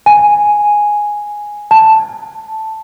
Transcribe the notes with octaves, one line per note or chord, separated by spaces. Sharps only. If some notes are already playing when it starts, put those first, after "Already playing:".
G#5
A5